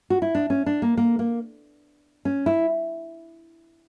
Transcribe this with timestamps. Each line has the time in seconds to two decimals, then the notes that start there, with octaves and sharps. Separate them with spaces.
0.10 F#4
0.22 E4
0.35 D4
0.50 C#4
0.66 D4
0.82 A#3
0.97 A#3
1.19 A#3
2.25 C#4
2.46 E4